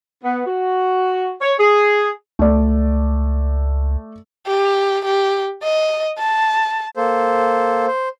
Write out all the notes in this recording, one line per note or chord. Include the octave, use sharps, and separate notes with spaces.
B3
F#4
C#5
G#4
C#2 A3 D5
G4
G4
D#5
A5
A#3 A4 C5
C5